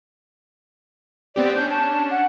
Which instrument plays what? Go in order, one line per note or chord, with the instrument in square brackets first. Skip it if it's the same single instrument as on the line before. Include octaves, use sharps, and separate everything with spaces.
[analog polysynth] B3 C4 G4 [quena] D5
[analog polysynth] C#4 D4 [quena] G6
[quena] A5
F#5